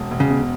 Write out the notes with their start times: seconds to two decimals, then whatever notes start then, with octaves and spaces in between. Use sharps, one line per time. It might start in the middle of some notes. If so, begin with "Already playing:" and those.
Already playing: E1
0.11 E1
0.20 C#3
0.30 B2